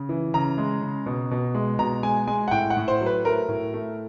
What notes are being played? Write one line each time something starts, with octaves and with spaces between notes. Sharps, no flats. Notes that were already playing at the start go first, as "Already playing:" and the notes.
Already playing: C#3
E3
C#3 A#5
G#3
C#3
B2
B2
G#3
B2 A#5
G#3 G#5
G#3 G#5
F#5
A2 G5
F#5
A2
C5
F#3
B4
A3 A#4
A2
A3